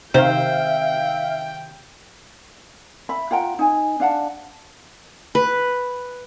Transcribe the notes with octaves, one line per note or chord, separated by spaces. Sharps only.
C3 D#3 C5 E5 F5 G5
E5 B5
F4 F#5 G5 A#5
D#4 G#5
D4 F5 F#5 A5
B4